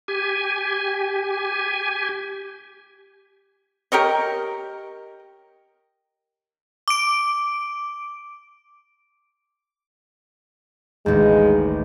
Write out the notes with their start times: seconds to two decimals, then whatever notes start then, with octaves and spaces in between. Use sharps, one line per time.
0.08 G4 G#5
3.92 G4 A#4 C#5 D#5
6.88 D6 D7
11.06 A1 D#2 G#3